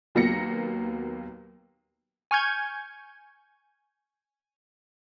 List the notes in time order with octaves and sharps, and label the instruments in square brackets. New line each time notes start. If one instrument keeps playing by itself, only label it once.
[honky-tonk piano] D#2 F#3 A#3 B3 A#6 C#7
[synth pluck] G#5 C#6 F6 G6 G#6